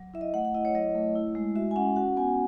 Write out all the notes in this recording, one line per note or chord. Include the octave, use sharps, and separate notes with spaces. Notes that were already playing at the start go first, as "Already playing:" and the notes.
Already playing: F#3
E4 E5
D#5
A3 F#5
F#5
E4 D#5
C#5
F#3 D#5
A3
E4
G#3
F#4 E5
G#5
C#4 F#5
F#4 F#5
B3 G#5